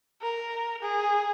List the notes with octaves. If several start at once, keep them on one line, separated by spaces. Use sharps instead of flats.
A#4
G#4